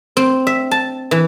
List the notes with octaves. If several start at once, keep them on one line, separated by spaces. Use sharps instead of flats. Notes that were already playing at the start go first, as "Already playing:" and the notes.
C4
E5
A5
E3